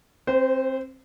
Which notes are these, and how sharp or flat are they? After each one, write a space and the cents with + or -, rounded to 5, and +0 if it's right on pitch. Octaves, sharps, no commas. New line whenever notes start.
C4 +20 C5 -25